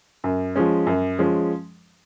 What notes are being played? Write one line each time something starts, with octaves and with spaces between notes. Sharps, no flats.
F#2
F3 G#3 C#4
F#2
F3 G#3 C#4